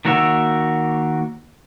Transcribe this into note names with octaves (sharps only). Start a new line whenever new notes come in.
D#3 A#3 F#4 C#5 E5